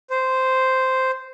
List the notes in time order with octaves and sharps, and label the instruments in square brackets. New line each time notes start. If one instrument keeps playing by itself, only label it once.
[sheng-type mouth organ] C5